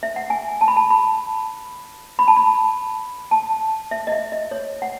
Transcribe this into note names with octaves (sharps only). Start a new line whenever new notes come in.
E5
F#5
G#5
A5
B5
A5
B5
B5
A5
B5
A5
E5
D#5
E5
D#5
C#5
F#5